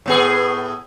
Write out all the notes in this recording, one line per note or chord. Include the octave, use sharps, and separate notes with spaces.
A2 B3 G#4